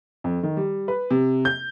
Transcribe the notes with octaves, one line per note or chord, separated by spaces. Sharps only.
F2
D#3
G3
B4
C3
G6